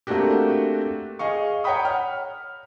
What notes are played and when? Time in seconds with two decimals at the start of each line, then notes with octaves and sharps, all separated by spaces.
0.07 A3 A#3 C4 D4 F#4 G4
1.19 G#4 D#5 F5 C#6
1.64 C#5 F#5 G5 A#5 B5 D#6
1.85 F6